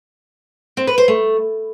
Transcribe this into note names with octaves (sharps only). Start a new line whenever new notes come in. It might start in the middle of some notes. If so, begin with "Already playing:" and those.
C4
B4
C5
A3